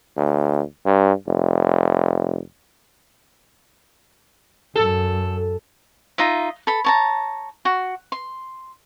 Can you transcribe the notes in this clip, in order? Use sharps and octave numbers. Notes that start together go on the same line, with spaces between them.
D2
G2
F1
F#2 A4
D#4 F4 D#5 E5
A4 B5
C#5 A5 A#5
F#4
C6